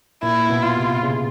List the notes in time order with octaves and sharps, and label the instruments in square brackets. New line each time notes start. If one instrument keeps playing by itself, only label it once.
[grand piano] A#2 [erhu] E4
[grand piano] B2
[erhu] F4
[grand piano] C3
C#3